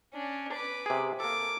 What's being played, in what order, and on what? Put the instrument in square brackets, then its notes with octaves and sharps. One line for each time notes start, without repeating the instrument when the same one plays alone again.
[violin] C#4 D4
B4 D6
[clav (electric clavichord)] C3 G#4
[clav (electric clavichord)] A#3 A4 [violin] D6